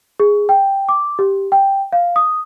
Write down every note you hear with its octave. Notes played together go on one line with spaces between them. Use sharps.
G#4
G5
D6
G4
G5
F5
D#6